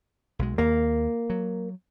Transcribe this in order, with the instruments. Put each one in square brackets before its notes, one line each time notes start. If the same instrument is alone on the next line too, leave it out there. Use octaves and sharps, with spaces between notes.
[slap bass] B1 B2 G#3
[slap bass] D#2 [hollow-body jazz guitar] A#3
[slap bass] F#3